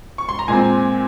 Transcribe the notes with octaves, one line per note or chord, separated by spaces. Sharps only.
C#6
C6
A#5
A#2 G#3 C4 G#5